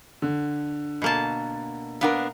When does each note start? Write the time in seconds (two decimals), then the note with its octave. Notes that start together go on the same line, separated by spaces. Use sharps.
0.22 D3
1.02 B2 A#3 A5
2.01 B3 D4 A#4 F5 F#5